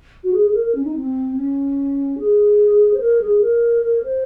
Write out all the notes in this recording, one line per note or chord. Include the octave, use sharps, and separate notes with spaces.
F#4
G#4
G#4
A#4
A#4
C#4
D#4
C4
C#4
G#4
C5
A#4
G#4
A#4
A#4
C5